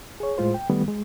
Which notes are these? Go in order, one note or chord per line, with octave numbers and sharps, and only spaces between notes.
G#4 C#5
A2 G#3 F4 C5
G5
D#3 G3 A3 B3
G#3